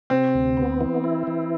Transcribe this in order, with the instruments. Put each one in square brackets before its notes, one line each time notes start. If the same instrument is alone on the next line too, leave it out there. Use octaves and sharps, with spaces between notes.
[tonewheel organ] C3 [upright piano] C4
[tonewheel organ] D2
B3
E3
E4
E3